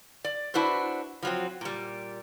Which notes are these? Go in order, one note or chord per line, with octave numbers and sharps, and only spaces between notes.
D5
D4 E4 F#4 B4 C5
F3 F#3 C4
A#2 G3